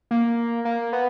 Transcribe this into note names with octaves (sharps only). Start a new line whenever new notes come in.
A#3
A#3
B3